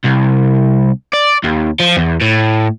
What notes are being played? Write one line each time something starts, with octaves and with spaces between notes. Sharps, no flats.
C2
D5
D#2
F3
E2
A2